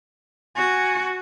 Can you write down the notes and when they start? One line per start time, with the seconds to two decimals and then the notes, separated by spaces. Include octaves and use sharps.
0.56 F#4 G#5